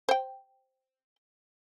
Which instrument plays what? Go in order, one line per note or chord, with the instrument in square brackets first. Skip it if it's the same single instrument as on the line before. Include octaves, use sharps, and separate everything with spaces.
[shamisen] C5 G5